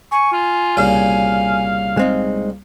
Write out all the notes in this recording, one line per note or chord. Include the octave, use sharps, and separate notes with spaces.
G#5 C#6
F4
C2 A#2 C#3 F5
G#3 C4 D#4